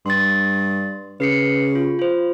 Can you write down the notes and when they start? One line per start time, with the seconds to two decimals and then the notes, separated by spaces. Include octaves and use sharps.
0.06 G2 C6 A6
1.20 C#3 B4 C7 C#7
1.73 F4 G4
1.99 F4 C5